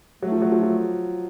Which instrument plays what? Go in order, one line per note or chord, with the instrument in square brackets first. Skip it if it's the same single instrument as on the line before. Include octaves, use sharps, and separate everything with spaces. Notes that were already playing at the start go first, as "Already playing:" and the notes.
[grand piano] F#3 [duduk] A3
[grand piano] F3
F#3
F3
F3